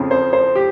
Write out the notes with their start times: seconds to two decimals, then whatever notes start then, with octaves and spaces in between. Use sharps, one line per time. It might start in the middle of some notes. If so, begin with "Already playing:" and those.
Already playing: F2 C#3 F3
0.11 C5
0.33 C5
0.55 G4